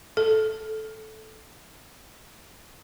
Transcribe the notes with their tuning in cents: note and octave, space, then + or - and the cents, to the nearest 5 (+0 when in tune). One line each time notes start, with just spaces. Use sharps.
A4 -10